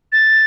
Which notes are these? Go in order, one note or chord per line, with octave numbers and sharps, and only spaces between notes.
A6